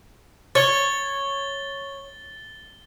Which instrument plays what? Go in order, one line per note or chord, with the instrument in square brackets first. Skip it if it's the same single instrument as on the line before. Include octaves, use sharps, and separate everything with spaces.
[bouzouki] C#5 [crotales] A6 G7